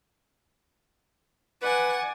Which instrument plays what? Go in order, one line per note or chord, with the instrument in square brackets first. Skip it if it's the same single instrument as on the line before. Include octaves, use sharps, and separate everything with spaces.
[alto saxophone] B4 [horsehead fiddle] D5 G#5 [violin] F#5